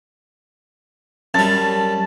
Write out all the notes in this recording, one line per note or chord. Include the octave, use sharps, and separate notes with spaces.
F#2 G3 A5